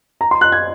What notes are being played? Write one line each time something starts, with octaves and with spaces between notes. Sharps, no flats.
A#5
C6
F#6
G#6